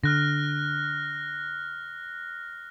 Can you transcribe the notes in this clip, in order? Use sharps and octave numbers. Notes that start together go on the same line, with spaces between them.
D3 F6 F#6 A#6